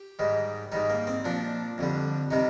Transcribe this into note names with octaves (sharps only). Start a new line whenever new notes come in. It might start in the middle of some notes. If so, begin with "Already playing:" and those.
Already playing: G4
G#2 D#3 G3
G#2 D#3 G3 D#4
A#3
C4
A#2 F3 D4
F2 D3 G3
C3 D#3 G3 D#4